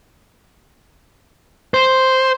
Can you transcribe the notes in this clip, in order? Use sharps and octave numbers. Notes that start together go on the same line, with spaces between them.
C5